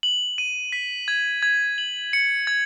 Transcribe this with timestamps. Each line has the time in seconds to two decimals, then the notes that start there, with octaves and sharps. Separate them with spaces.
0.03 F#7
0.38 D#7
0.72 B6
1.08 G#6
1.43 G#6
1.78 F#7
2.13 C#7
2.47 G#6